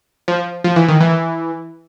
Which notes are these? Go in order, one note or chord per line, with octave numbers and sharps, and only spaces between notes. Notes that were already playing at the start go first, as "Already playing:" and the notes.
F3
F3
E3
D#3
E3